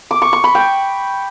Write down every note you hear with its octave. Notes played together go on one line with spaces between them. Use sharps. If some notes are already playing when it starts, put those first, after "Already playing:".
D6
C#6
C#6
B5
G5